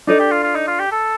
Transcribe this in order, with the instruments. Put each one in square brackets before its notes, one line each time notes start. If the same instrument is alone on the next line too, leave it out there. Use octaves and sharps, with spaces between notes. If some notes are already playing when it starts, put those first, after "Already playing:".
[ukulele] D4 A4 D5 [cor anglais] D#4
[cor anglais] G4
F4
F4
D#4
F4
G4
A4